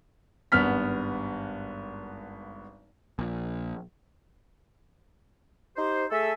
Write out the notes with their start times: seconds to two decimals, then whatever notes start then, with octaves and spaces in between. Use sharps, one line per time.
0.52 G#1 G2 B3 F6 B6
3.19 A#1
5.77 D#4 G4 C5
6.10 A3 G#4 A4 E5 G#5